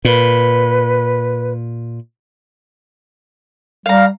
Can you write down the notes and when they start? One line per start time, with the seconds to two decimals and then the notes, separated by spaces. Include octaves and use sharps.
0.05 A#2 B4
3.86 G3 F5 A#5